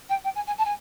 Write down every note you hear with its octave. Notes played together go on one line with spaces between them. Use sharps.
G5
G5
G#5
G#5
A5
G#5